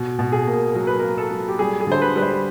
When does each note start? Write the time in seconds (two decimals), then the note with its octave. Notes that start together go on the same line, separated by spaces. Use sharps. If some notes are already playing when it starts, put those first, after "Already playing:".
Already playing: B2
0.19 B2
0.32 G#4
0.47 A#3
0.74 F#3 A#4
0.87 B4
0.99 A#3 A#4
1.18 A4
1.31 F#3
1.48 G4
1.59 G3 G#4
1.81 G#4
1.87 D3 C5
2.02 B4
2.15 G3 B4
2.22 C5